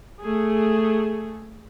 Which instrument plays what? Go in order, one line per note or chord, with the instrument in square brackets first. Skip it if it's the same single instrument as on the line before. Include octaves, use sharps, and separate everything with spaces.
[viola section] A3 G#4